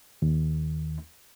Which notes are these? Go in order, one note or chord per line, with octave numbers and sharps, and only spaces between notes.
D#2